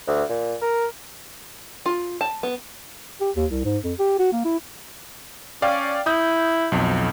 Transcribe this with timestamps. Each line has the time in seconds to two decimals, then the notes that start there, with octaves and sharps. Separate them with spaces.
0.07 D2
0.29 A#2
0.61 A#4
1.86 F4
2.21 A5
2.43 B3
3.21 G4
3.36 D#2
3.51 C2
3.65 G#2
3.84 F2
3.99 G4
4.19 F#4
4.33 A#3
4.45 E4
5.62 C#4 D5 F5 G5
6.06 E4 D#6 G6
6.72 B1 F2